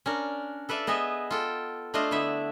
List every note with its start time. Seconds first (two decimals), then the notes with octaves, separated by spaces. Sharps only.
0.06 C#4 D4 A#4
0.69 A4 B4 D5 E5 F5
0.87 B3 G#4 D#5 E5 G#5
1.31 F4 A4 G5
1.94 A3 D4 F4 C5 D#5 F5
2.11 D3 B3 E4 E5